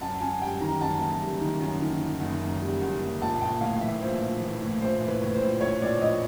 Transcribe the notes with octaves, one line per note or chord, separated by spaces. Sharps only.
F#2 A5
F#2 G#5
G3 G5
D#3 A#5
F#2 A5
F#1
G3
D#3
F#2
D#3
D#3
F#1
F#2
G3
F#1
F#1
A#1 A5
A#1 G5
A2 F5
E3 E5
A#1 C5
A#1
E3
A2
A#1 C5
E3
B4
A2
C5
A#1
A#1 C#5
A#1 D5
A#1 D#5